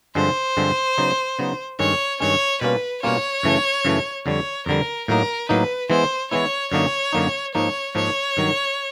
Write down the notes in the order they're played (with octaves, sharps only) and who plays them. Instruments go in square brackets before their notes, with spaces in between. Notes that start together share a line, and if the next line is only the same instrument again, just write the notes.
[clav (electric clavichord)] G2 D3 F3 G#3 C4 [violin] C5
[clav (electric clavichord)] G2 D3 F3 G#3 C4
C#3 F#3 B3 D#4
C#3 F#3 B3 D#4
[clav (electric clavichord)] G2 D#3 G#3 C#4 [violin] C#5
[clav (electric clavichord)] G2 D#3 G#3 C#4 [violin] C#5
[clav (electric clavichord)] B2 G3 A#3 C#4 F4 [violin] B4
[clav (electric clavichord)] B2 G3 A#3 C#4 F4 [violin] C#5
[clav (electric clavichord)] F#2 C#3 E3 A3
F#2 C#3 E3 A3
[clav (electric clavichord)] F2 D3 G3 [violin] C#5
[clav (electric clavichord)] F2 D3 G3 [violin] A#4
[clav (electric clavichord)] A2 F#3 A#3 D#4 [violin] A#4
[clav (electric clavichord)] A2 F#3 A#3 D#4 [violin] B4
[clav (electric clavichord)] E3 G#3 B3 E4 [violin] C5
[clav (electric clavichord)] E3 G#3 B3 E4 [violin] C#5
[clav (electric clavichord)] F#2 D3 F#3 A#3 D#4 [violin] C#5
[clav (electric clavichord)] F#2 D3 F#3 A#3 D#4
[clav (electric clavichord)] G#2 F3 A#3 D#4 [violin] C#5
[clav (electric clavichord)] G#2 F3 A#3 D#4 [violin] C#5
[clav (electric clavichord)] G2 D#3 F#3